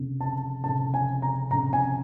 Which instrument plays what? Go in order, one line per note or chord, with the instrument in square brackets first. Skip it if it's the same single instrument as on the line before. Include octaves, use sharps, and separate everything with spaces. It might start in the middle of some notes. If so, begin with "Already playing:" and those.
Already playing: [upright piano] F1 F2 C#3
A5
F1 F2 C#3 A5
G#5
A#5
F1 F2 C#3 A#5
G#5